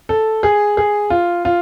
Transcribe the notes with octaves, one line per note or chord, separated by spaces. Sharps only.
A4
G#4
G#4
F4
F4